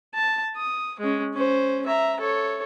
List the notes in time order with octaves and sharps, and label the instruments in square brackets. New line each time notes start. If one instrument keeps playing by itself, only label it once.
[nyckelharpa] A5
D#6
G#3 C#4
C#4 C5
E5 A#5
A4 C#5